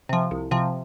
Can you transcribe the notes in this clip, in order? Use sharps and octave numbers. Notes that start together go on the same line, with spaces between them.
C3 F3
C2
C3 F3